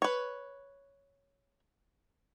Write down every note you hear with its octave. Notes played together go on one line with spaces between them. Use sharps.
B4 C#5